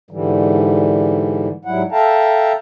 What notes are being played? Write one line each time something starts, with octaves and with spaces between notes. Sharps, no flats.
G#2 D3 E3 G3
G#2 F#3 G3 E4 F#5
A4 E5 F5 G5 A5 A#5